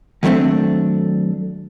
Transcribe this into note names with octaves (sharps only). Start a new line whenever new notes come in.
D#3 F#3 G3 A3 C4 D4